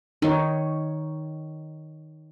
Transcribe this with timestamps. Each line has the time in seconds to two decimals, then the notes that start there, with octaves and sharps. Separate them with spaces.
0.22 D#3 D#4 C#5